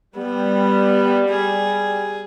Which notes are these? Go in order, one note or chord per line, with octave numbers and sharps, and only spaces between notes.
G3 B3
G#4